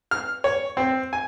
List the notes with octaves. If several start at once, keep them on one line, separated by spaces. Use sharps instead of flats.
F6
C#5
C4
G#5